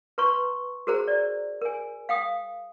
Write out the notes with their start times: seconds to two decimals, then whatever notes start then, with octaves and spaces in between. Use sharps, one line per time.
0.18 B4 A#5 C6 C#6
0.87 F#4 G#4 A#4 C5 A#5
1.08 D5
1.61 A#4 G#5
2.09 F5 G5 D#6